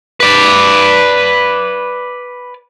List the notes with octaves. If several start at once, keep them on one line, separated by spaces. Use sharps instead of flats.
B4 D5